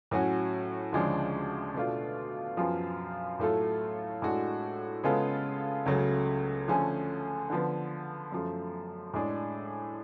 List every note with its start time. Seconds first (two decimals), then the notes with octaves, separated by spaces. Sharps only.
0.11 A2 F#3 C#4 F#4
0.92 D2 C#3 F3 G#3 D4
1.74 B2 A3 D4 F4
2.57 F#2 F3 B3 F4 G#4
3.39 A2 F#3 A3 F4 A4
4.22 A2 G#3 D4 F#4 A4
5.03 C#3 G#3 B3 F4 A4
5.86 C#2 C#3 F#3 A3
6.68 D3 F3 A3 C#4 G#4
7.50 D3 F3 B3
8.32 F#2 F3 A3
9.14 A2 G#3 D4 G#4